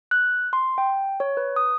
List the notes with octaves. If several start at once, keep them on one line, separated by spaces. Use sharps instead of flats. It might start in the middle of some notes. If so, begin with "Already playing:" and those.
F#6
C6
G5
C#5
B4
D#6